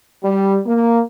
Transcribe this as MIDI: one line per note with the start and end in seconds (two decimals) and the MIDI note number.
0.24 0.59 55
0.67 1.01 58